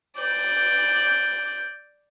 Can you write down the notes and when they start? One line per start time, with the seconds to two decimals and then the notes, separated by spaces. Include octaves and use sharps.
0.17 D5 G6